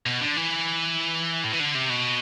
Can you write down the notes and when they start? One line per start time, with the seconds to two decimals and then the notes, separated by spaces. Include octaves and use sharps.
0.06 B2
0.21 D3
0.37 E3
1.44 A2
1.52 E3
1.60 D3
1.74 C3
1.90 B2